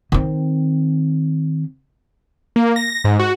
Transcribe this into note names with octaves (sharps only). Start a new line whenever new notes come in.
D#3 C4
A#3
A#6
G#2
F#4